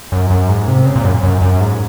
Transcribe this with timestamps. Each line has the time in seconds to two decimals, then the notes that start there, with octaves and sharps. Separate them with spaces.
0.12 F#2
0.30 F#2
0.48 G#2
0.68 C3
0.86 C#3
0.96 A#2
1.04 F#2
1.23 F#2
1.41 F#2
1.60 G#2